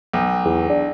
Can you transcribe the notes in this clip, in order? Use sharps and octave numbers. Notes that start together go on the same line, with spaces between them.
B1
E2
D4